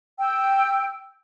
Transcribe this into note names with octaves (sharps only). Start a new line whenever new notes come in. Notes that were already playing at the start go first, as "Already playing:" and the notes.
G5 E6